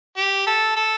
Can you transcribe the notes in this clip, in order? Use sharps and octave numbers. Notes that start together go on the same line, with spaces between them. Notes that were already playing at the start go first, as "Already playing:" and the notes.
G4
A4
A4